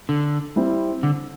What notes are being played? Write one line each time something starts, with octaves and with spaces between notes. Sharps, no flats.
D3
G3 C4 E4
D3